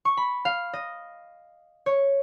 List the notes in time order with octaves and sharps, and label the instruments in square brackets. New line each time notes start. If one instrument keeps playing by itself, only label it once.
[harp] C#6
B5
F5
D#5
C#5